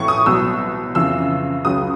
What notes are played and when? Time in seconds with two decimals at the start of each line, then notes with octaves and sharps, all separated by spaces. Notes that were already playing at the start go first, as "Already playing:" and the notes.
Already playing: A2 E3 A3 C#6
0.08 D#6
0.26 C2 B2 F#3 E6
0.95 F2 C#3 E3 E6
1.65 C#2 C#3 F#3 D#6